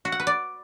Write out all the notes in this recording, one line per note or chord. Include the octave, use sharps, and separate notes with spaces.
F#4
F#5
B4
D5